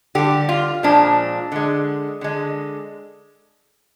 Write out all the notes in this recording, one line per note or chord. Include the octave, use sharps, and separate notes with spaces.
D3 G3 G4
F4
A#2 F3 G#3 D4
D3 G#3
D3 G#3